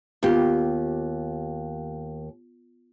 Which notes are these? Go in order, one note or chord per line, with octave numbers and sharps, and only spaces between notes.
D#2 B3 F4 G4